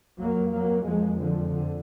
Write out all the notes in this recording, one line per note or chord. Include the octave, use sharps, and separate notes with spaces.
F2 F#3 A#3
F#3 A#3
F3 G#3
D3 F3
D3